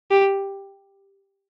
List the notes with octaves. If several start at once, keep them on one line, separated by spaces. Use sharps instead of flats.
G4